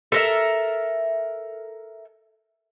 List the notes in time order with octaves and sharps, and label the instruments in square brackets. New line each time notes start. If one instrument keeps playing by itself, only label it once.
[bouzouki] A4 A#4 E5